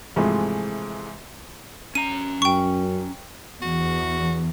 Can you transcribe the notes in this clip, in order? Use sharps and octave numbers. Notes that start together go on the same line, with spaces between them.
G#2 C3 E3 F3 G#3 A3
C#4 A#5 D#7
F#2 G5 C#6
E2 F#4